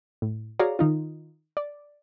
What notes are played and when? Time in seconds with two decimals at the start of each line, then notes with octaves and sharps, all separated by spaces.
0.22 A2
0.59 F#4 G#4 C#5 D5 F5 A#5
0.79 D#3 D#4 F4
1.57 D5